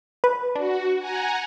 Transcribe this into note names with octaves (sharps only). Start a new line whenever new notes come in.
B4
D4 F#4
F#5 G#5 A#5